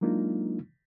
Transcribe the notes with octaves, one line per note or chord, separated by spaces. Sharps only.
F#3 G#3 A#3 D4 D#4 F4